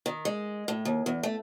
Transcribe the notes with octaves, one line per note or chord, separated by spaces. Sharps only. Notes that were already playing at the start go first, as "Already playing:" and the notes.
D#3
G#3
A2
D#2
E2
A3